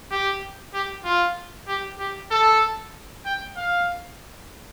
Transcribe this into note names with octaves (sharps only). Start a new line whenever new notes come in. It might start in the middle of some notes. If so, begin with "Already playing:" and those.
G4
G4
F4
G4
G4
A4
G5
F5